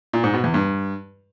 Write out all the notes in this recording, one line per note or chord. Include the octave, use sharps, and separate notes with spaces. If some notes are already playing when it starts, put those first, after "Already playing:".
A#2
G#2
B2
E2
G2